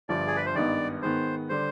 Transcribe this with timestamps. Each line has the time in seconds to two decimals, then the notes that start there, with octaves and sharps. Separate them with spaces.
0.09 G1 G2 F3 D5
0.27 G#4
0.36 B4
0.46 C5
0.55 G#1 G2 D#3 B3 D#4 D5
1.02 G#2 D#3 B3 C5
1.49 D3 G3 C5